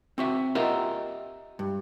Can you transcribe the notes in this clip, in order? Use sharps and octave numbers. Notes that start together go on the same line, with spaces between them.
C4 F#4 E5
F4 G4 A#4 D#5 E5 F#5
G2